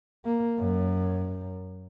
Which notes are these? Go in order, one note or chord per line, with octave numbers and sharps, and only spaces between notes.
A#3
F#2